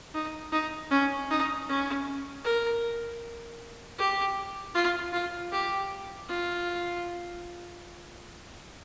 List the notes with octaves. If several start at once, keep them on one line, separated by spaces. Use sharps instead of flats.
D#4
D#4
C#4
D#4
C#4
A#4
G4
F4
F4
G4
F4